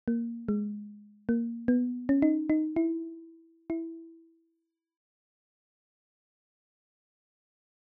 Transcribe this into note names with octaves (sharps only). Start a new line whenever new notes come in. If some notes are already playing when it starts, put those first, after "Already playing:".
A#3
G#3
A#3
B3
C#4
D#4
D#4
E4
E4